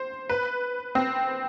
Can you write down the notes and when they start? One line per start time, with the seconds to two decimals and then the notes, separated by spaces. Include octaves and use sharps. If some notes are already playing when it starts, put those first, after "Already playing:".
Already playing: C5
0.29 B4
0.95 C4